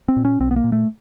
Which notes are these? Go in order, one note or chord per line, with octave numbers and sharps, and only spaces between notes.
C4
A#2
C#4
B1 C4
B3
A#3
A#2
A3